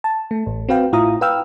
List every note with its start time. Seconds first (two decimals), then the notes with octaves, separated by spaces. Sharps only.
0.04 A5
0.31 A3
0.46 A1
0.69 C4 F#4 B4 F5 G5
0.93 A2 E4 F4 F5 A#5 D#6
1.21 B4 F5 G5 E6 F6